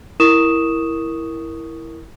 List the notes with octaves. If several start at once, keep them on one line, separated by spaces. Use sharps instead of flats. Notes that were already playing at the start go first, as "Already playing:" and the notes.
E4 A#4 C#6 D#6 E7